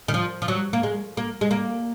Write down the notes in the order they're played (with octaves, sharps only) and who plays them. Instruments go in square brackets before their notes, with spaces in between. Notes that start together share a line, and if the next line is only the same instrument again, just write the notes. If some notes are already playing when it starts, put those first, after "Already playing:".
[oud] D#3
F3
F3
F#3
A#3
G#3
A#3
G#3
A#3